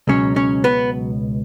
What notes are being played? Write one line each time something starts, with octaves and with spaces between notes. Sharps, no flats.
C#2 B2 F#3 C#4 C#5
C#4 C#5
B3 B4